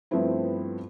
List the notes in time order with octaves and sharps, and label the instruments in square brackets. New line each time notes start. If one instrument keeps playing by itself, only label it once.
[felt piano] G2 F3 A3 B3 C4 E4